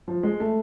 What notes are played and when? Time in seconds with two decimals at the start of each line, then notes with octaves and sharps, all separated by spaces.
0.08 F3
0.23 G#3
0.40 A3